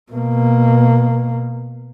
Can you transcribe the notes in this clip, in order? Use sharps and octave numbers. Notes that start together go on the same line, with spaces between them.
B2 A#3